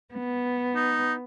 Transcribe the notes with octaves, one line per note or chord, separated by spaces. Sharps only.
B3
D#4